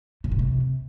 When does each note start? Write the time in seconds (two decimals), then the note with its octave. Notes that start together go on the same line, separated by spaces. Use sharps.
0.24 C#3
0.32 A#2
0.39 C3